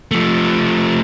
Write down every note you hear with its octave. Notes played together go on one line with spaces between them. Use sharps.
F3 A3